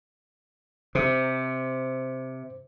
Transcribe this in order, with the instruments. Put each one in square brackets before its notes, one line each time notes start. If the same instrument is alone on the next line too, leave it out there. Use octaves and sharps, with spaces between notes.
[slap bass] C3 [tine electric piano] C5